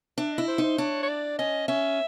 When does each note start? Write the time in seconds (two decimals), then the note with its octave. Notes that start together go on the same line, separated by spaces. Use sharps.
0.18 D4 E5
0.33 D#5
0.38 E4
0.48 C5
0.58 D#4
0.63 C5
0.78 D4 C#5
1.03 C#5
1.09 D5
1.39 C#4 D#5
1.68 C#4 E5